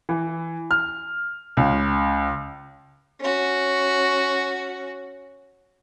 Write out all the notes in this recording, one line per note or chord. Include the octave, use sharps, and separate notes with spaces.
E3
F6
C#2
C#4 F#4